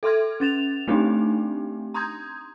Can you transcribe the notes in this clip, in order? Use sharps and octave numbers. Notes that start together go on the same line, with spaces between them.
A4 E5 C6 F6 G#6
C#4 A6 E7 F7
A3 B3 C4 D4 D#4 G4
A#5 C6 D#6 G6 G#6